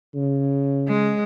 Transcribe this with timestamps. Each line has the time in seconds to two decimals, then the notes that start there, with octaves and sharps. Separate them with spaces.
0.15 C#3
0.88 G#3